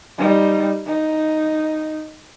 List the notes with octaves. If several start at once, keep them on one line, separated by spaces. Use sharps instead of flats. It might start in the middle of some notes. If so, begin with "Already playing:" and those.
G3 D#4
D#4